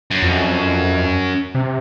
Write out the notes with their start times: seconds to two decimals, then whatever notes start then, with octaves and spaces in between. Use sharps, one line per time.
0.11 F#2
0.22 F2
1.55 C3